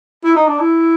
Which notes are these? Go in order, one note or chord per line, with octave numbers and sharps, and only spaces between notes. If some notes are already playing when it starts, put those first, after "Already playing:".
E4
D#4
D4
E4